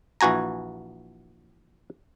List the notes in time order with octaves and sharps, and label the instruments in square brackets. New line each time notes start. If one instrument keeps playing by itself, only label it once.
[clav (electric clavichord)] A#1 E3 F#4 G#5 A#5